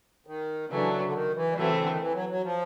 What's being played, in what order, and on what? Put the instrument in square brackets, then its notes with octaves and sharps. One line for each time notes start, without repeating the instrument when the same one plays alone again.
[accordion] D#3
[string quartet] C#3 F#3 A3 D4 [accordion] E3
[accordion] D3
D#3
E3
G3
[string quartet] E3 A3 C4 [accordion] F#3
[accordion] C#3
D3
D#3
E3
F#3
F#3
F3